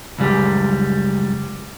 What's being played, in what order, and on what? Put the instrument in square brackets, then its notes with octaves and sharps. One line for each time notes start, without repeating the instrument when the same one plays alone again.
[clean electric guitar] C#2 F#2 G3